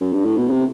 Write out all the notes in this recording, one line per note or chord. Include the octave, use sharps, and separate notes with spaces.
F#2
G2
A2
B2
C3